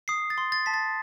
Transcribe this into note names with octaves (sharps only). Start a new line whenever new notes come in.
D#6 C7
A6
C6
A6
A5 B6
A6